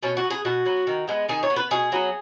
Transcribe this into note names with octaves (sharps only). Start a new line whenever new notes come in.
B2 C#4
F#4
B3
G#4
B2 F#4
F#3 B3
D#3
G#3 B3
D#3 G#4
C#5
B3
B4
B2 G#4
F#3 B3